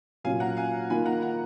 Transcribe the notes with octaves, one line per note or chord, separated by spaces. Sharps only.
A#2 F#3 C#4 F4 F5 G#5
F#5 A#5
F5 G#5
D#3 A#3 F4 G#5 B5
F#5 A#5
F#5 A#5